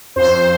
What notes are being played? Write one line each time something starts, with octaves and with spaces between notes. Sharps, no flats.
F2 C5